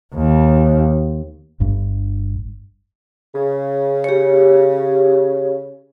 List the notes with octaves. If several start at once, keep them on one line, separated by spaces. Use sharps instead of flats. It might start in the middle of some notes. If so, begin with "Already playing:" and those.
D#2
G1 G2
C#3
G4 C#5